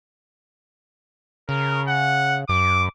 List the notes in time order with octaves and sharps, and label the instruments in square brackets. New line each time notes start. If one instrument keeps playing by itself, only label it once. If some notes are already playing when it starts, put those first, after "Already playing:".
[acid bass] C#3 [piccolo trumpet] A#4
[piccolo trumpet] F#5
[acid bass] F#2 [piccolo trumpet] D6